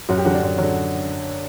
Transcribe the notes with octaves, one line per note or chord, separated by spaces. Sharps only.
F#2 F#4
G4
D3 F#3 F#4
D4
F#2
D3 F#3